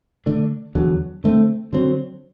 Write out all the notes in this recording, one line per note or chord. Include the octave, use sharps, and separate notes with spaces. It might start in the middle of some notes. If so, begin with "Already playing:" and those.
D3 A3 D4
E2 D3 F#3
D3 A3 C4
D3 F#3 C4